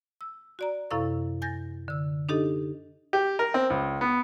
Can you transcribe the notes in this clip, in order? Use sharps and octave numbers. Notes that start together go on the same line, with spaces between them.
E6
F#4 D5 A#5
F#2 C3 E4 A4 F5 C#6
G#5 G6 A6 A#6
D3 E6
D4 D#4 G4 A4 D#5
G4
A#4
C4
C#2
B3